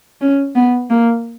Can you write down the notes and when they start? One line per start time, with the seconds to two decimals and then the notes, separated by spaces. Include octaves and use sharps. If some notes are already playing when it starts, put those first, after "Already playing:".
0.21 C#4
0.55 B3
0.90 A#3